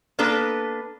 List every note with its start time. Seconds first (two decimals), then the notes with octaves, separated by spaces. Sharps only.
0.19 A#3 B3 D4 A4 B4